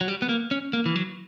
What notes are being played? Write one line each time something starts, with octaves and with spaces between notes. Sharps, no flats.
F#3
G3
B3
A#3
C#4
A#3
E3
F#3